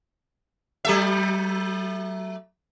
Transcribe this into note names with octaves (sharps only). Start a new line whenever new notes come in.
F#3 A3 E5